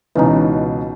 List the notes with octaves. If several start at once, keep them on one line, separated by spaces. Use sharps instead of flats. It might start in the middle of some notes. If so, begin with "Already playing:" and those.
C#2 B2 E3 C#4 D#4